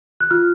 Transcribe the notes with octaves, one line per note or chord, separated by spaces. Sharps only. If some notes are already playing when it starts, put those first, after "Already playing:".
F#6
F4 F6